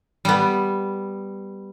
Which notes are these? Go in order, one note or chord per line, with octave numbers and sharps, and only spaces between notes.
G3 B3